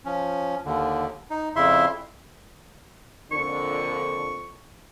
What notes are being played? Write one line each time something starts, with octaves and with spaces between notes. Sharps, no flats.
F3 C#4
D#2 D3
D#4
F2 C#3 E4 E5 C6
F2 A#2 D3 C#6